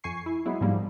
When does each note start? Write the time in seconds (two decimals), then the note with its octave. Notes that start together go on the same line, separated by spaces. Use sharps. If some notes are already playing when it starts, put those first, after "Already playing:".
0.04 F2 G#5 C#6 C7
0.26 E4
0.46 F#3 G#3 B3 E4
0.61 G#2 F3 G3 A#3